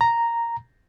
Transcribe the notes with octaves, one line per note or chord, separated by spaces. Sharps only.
A#5